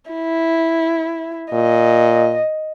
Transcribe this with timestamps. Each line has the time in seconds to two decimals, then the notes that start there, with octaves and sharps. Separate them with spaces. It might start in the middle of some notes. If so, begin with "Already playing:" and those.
0.10 E4
1.53 A#2 D#5